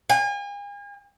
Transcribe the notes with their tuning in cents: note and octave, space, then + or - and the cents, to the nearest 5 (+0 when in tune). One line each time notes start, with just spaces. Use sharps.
G#5 -40